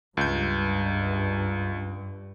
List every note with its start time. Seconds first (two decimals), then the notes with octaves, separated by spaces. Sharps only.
0.17 C#2 G2 G6